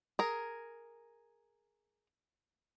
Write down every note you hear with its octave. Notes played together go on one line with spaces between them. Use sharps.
G#4 A#4